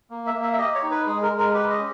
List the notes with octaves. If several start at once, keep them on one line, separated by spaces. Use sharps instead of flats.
A#3
E5
A#3
E5
E5
G4 D#5
C#5
D#4
B4
G#3 G#4
A#4
G#3
A#4
G4 B4
D#5
C#4